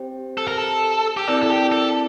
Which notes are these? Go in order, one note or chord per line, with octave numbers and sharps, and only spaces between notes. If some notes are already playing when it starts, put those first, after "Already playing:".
Already playing: C4 G4 C5 G5
A4
A#4
A4
G4
C4 E4 A4 A#4 D5 A5
A4
G4
A4